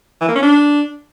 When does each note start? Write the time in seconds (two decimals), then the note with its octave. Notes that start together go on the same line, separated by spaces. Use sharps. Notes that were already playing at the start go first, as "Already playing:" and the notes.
0.21 E3
0.28 A#3
0.35 C#4
0.43 D4